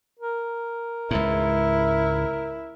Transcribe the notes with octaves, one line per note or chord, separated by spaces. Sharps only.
A#4
C#2 G#2 E4